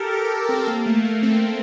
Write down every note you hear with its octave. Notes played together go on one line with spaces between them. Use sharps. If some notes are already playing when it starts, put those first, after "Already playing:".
Already playing: G4 A4 A#4
A4
C4
A#3
A3
A#3
C4